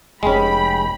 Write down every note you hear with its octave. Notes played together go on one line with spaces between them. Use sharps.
F1 G#3 C#4 G5 B5